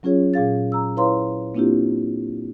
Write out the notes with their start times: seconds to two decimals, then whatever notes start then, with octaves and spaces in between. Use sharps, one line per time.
0.03 F#3 C#4 F4 G#4 C#5
0.34 A#2 G#4 F5 A6
0.72 A#5 E6
0.97 E4 B4 C#5 F5 A#5 C6
1.55 A#3 C4 D4 E4 F4 G4